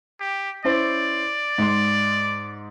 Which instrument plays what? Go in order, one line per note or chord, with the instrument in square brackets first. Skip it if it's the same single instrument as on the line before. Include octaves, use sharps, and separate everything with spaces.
[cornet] G4
[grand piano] C#4 E4 C5 [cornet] D5
[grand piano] G#2 C6